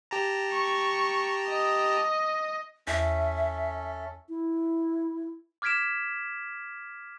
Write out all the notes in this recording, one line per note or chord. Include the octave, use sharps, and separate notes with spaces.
G4 A5 A#5
C#6
D#5
E2 C#4 A4 E5
E4
D6 F6 G#6 B6 D7 E7